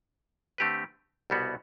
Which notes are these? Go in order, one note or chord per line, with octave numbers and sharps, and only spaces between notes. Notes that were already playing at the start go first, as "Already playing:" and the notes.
D3 A3 C4 G4 B4
C2 B2 G3 B3 F#4